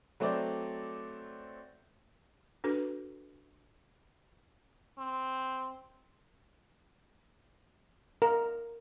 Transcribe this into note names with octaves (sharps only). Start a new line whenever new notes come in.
F#3 A3 C4 C5 D5
D4 F#4 A4 B4
C4
A#4